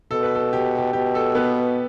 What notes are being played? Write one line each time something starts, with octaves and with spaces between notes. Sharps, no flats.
B2 A4
B4
A4
G4
G4
B2 G4
A4
B3 B4